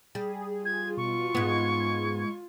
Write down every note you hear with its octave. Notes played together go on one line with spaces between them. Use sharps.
G3 G#4
F4 G#6
B2 C#6
G#2 G#3 B3 G#6